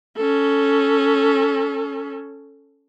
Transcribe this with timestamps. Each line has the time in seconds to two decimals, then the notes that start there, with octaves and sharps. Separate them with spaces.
0.17 C#4 A4